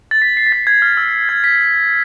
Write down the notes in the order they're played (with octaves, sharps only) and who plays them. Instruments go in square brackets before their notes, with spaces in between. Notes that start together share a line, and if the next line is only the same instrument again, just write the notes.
[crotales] A6
B6
C7
B6
A6
G#6
F6
E6
G#6
B6